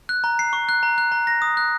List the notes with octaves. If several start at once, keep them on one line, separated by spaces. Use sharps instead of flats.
F#6
A#5
C7
C#6
F#6
A#5
F#6
A#5
A#6
D#6
F#6